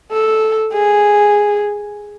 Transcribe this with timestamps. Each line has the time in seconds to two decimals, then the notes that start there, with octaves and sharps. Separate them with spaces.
0.12 A4
0.73 G#4